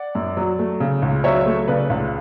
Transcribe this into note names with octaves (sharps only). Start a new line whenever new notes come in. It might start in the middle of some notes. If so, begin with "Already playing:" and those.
Already playing: D5 F#5
F#2
F#3
A3
C#3
C#2
F#3 C#5 E5
A3
C#3 B4 D5
C#2